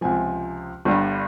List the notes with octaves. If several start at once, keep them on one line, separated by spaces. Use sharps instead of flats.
C#2 C3 F3 G#5
G1 G2 G3